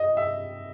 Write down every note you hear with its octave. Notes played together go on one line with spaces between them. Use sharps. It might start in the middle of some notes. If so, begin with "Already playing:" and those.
Already playing: D#5
E5